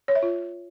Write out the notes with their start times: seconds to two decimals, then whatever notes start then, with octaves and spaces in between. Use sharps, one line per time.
0.08 C#5
0.15 E5
0.23 F4